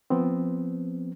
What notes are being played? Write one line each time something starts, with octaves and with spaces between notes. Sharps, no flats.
F3 B3 C4